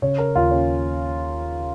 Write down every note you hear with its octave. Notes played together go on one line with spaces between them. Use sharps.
C#3 C#5
A#4
D#2 F4
C#4